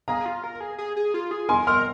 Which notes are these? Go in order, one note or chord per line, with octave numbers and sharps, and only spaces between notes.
G#4 F5 A#5
F4
A#4
G#4
G#4
G#4
F4
G#4
A#4 G#5 C6
A#4 C6 F6